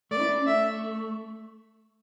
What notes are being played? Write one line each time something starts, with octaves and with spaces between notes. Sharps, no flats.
A3 D5
E4
D4
C#4
A3 E5